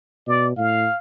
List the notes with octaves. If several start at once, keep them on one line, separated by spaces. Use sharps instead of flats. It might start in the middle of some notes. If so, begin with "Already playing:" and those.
B2 D5
A2 F5